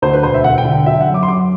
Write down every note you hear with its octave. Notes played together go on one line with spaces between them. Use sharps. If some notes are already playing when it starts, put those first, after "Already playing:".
D2 C5
B4
E1 C5
E5
E1 F#5
G5
D3
G5
F#3 E5
F#5
F#2
D6
C6
F#2 D6